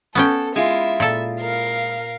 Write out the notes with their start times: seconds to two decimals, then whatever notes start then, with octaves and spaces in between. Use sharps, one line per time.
0.15 B3 C#4 A4 G5
0.56 G#3 E4 F4 E5
1.00 A#2 A4
1.40 A#4 F5